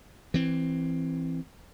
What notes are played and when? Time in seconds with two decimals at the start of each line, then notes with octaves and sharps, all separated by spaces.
0.34 E3 C4